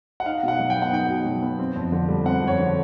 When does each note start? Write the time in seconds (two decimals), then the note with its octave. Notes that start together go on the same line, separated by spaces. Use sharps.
0.20 F#5
0.26 D#4 F5
0.43 B2
0.48 F#5
0.59 F#3
0.70 G5
0.76 B3
0.82 F#5
0.93 D#4 G5
1.09 B2
1.25 F#3
1.42 B3
1.59 C4
1.76 F2
1.92 D3
2.09 G3
2.26 C4 F#5
2.42 F2
2.47 C#5
2.59 D3